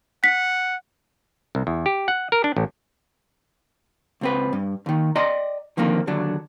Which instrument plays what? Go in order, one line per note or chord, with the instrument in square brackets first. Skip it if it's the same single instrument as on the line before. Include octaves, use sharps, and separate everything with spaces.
[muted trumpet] F#5 [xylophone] B6
[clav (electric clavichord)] C2
E2
G4
F#5
A#4
D4
A1
[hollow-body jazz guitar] C#2 C4 B4
G2
D#2 D#3
D5 D#5 G5 A#5 C6
D3 D#3 F3 A#3 C4
D#2 D3 F#3 D4